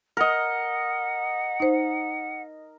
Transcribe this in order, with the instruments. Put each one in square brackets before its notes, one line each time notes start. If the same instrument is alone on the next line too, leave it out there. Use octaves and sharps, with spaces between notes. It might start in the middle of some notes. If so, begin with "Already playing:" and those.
[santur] A#4 D#5 [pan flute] F#5
[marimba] D#4 C5